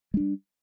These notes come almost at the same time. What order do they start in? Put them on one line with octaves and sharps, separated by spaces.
G#3 D4 G3